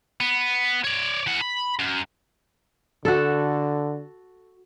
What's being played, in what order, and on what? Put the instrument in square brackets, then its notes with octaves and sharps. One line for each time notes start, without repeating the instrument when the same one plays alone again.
[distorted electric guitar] B3
C#5 D5
E3 F#5
B5
F#2
[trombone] D3 [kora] F#4 A4